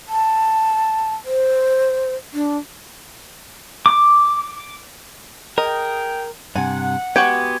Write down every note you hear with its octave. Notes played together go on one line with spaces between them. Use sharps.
A5
C5
D4
D6
G#4 A#4 D#5 G5
G2 C3 F#5 G#5
G#3 B3 F#4 G4 G5 G#6